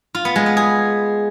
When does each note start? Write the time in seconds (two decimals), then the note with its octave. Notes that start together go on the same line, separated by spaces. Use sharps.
0.15 F4
0.25 B3
0.36 G#3
0.46 B3
0.57 G#4